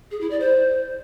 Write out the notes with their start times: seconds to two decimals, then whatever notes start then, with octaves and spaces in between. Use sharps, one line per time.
0.11 G#4
0.21 E4
0.31 D5
0.40 C5